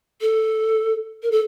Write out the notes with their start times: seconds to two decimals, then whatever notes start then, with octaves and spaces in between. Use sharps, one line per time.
0.21 A4
1.23 A#4
1.31 A4